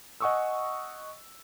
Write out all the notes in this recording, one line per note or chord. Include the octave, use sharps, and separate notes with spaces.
D#5 F#5 G#5 C#6 D#6 E6